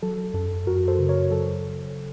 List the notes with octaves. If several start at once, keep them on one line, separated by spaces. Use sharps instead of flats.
F#3 A4
F#2 A4
F#2 F#4 A#4
A4 C5
C#3
A#4 C#5
F#3 A4